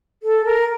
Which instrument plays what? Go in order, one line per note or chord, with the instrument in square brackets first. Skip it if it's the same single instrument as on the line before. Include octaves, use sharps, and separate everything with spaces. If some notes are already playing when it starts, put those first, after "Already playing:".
[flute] A4
A#4